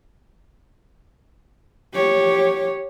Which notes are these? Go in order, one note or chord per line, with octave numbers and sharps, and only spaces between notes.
G4 C#5